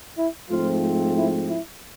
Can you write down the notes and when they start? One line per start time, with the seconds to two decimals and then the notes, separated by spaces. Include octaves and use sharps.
0.18 E4
0.50 G#2 F3 A3 C4 F4
1.17 E4
1.49 E4